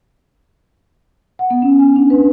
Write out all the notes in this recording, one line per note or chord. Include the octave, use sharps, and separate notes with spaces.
F#5
B3
C#4
G#5
D4
B4